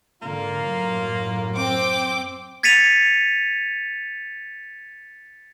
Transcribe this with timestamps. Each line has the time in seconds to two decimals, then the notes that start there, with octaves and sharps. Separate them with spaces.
0.22 G#2 D3 A#3 F4
0.65 F#2 A2 F#3
1.56 C4 G5 D6
2.63 G#6 A6 B6 C#7 D#7 F7